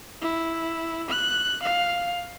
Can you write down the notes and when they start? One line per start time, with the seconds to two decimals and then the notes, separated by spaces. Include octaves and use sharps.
0.22 E4
1.10 F#6
1.63 F5